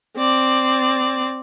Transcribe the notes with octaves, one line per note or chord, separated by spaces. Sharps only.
C4 D5